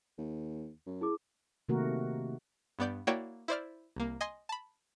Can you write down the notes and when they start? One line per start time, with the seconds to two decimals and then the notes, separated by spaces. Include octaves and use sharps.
0.18 D#2
0.86 F#2
1.01 E4 G#4 D6
1.69 C3 D#3 A3 A#3 F#4 A#4
2.79 G2 B3 D5 G6
3.07 A#3 E4 F#4 C#5 D5 G5
3.48 E4 C5 D5 F6
3.96 C2 A#3
4.21 D#5 G#5 C6
4.49 A5 B5